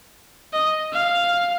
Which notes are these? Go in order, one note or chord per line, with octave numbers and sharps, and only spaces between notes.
D#5
F5